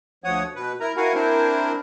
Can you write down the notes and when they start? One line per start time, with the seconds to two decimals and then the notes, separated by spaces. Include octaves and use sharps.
0.24 D2 F3 C#5 F#5 D#6
0.56 B2 B4
0.80 E4 A#4 A#5
0.97 E4 F#4 A#4 F5 F#5 G#5
1.14 C4 D4 E4 A#4 C5